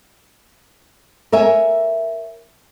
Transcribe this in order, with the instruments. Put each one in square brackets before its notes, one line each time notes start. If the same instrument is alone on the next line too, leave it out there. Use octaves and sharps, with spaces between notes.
[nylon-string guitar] A#4 C#5 E5 G#5